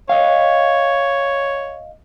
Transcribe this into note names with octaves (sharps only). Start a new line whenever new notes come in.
C#5 D#5 F5